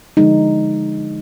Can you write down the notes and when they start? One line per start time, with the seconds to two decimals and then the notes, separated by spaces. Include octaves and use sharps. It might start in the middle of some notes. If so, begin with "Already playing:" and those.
0.17 D3 F3 G#3 D#4